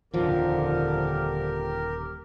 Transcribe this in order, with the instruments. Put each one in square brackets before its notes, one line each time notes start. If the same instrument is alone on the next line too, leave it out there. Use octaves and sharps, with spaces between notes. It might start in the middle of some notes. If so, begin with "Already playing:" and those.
[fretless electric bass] D#1 F3 [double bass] F2 D3 [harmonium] G4 A#4